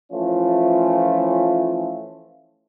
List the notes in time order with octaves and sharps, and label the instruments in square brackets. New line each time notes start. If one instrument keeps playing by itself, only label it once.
[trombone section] E3 F3 A3 C#4 F4